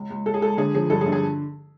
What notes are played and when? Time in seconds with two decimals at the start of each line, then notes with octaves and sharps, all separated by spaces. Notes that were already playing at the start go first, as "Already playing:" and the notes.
Already playing: C#2
0.10 C#2
0.26 C#2 A4
0.34 G#4
0.41 C#2 A4
0.57 D3 G#4
0.74 F3 G#4
0.90 G2 A4
1.01 G#4
1.06 D3
1.12 G#4